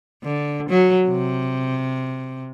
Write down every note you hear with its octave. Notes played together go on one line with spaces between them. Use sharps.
D3
F#3
C3